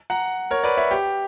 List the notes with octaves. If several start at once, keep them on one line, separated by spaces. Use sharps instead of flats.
F#5 A#5
A#4 C#5
B4 D5
C#5 E5
G4